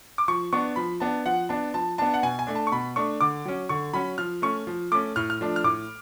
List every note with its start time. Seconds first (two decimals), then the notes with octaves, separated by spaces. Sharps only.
0.18 D6
0.28 F3 C#6
0.53 B3 D4 C#6
0.76 F3 B5
1.00 B3 D4 A5
1.26 F3 F#5
1.49 B3 D4 A5
1.74 F3 A5
1.98 B3 D4 A5
2.14 F#5
2.23 B2 G#5
2.39 G#5
2.47 A3 D4
2.55 A5
2.67 C#6
2.72 B2 B5
2.96 A3 D4 C#6
3.21 D3 D6
3.45 F#3 C#4
3.69 D3 C#6
3.93 F#3 C#4 B5
4.18 F3 F6
4.42 A3 C#4 C#6
4.67 F3
4.92 A3 C#4 D6
5.16 A2 F6
5.30 F6
5.41 F3 A3 D4
5.56 F6
5.64 A2 D6